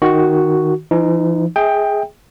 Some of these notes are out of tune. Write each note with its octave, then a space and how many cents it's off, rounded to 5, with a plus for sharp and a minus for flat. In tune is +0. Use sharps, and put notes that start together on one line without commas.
D#3 +0 F#4 +0 C#6 +5
E3 +45 D#4 +0
G#4 +0 E5 -40 G5 +15